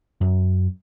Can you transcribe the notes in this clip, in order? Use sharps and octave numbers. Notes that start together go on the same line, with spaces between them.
F#2